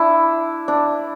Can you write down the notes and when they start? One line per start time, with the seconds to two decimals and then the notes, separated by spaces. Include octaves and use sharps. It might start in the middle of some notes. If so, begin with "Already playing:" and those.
Already playing: D4 E4
0.68 D4